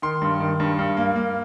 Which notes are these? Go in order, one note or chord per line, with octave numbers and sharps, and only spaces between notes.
D#3 C6
G2
D#3
G2
G2
A#3
A#3